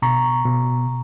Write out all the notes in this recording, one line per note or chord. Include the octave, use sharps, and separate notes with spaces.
B2 A#5 C#6
B2